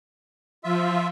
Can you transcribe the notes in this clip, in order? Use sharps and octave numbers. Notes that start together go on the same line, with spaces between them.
F3 F4 E5